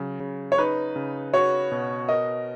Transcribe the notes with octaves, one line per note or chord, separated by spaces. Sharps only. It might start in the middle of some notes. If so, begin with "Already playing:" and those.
Already playing: C#3 F#3
C#3
C#5
D#4 B4
C#3
F#4 C#5
B2
A#4 D#5